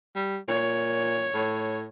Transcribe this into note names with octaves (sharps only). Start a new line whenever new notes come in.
G3
A#2 C#5
A2